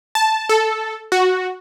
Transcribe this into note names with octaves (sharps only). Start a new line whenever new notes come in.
A5
A4
F#4